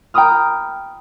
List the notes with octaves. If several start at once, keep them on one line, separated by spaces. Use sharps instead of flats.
G5 A#5 B5 D#6 F6